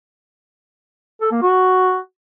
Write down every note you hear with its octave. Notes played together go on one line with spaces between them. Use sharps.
A4
A#3
F#4